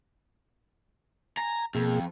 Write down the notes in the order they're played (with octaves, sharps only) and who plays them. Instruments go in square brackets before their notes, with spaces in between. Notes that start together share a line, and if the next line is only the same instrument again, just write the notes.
[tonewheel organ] G#5 [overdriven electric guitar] A#5
[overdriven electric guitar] F2 [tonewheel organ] B2 A#3 G#4